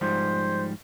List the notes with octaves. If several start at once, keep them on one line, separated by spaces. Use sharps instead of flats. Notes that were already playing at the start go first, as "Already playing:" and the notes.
G#2 F3 G3 C5